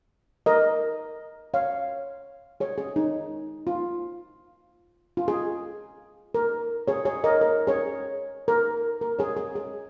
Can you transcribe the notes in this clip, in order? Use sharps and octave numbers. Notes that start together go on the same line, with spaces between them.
A#4 D#5
C#5 F5
G#4 C#5
G#4
D#4
F4
F4
G#4
A#4
G#4 C#5
G#4 C#5
A#4 D#5
A#4
G#4 C#5
A#4
A#4
G#4 C#5
G#4
G#4